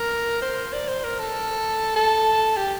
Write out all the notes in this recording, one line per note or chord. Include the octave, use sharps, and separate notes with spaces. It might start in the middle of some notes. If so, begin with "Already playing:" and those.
Already playing: A#4
C5
D5
C5
A#4
A4
A4
G4